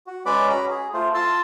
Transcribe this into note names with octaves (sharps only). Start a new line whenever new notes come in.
F#4
G#3 C#4 B4 D5 B5 D6
C#4 F#4 A#5 B5
G#4
A3 F4 C5
F4 A5 C6 E6